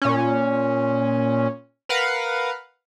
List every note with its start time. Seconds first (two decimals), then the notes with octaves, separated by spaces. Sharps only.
0.02 A#2 C#4
1.89 A#4 B4 F5 F#5